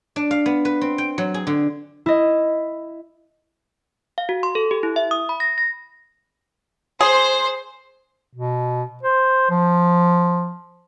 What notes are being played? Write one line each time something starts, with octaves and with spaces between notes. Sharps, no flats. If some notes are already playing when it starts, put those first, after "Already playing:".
D4
F5
B3
B4
C4
G5
F#3
G#4
D3
E4 D#5
F5
F#4
C6
A4
G4
E4
E5
D#6
B5
A#6
A#6
G#4 C5
B2
C5
F3